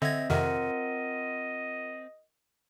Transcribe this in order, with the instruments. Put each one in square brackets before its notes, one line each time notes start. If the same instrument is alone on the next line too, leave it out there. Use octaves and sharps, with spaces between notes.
[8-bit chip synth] D3 G#6 [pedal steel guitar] C4 [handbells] D#5 E5 A#6
[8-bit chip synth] F2 C3 D#3 [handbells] F4 A#4 F#5 [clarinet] D#5